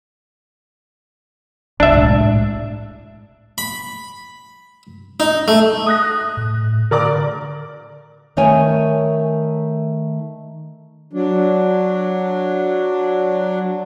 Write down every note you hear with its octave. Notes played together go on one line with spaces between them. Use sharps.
C2 D4 E5
A2 G#3
B5
D#4
A3
D#6 F#6 A#6
A2
D3 A#4 D5 D6
D#3 A3 A#4 C#5 G#5
F#3 D4